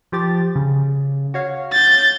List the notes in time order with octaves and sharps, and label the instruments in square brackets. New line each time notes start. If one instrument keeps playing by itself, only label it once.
[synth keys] F3 G4 A6
C#3
F#4 C#5 F5
[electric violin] G6 A6